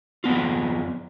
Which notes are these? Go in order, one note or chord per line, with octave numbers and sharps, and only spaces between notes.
F2 D#3 B3 F4